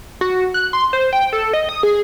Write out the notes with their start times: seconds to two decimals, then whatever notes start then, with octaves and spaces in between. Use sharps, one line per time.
0.21 F#4
0.54 F#6
0.73 C6
0.93 C5
1.13 G5
1.33 A4
1.53 D#5
1.69 D#6
1.83 G#4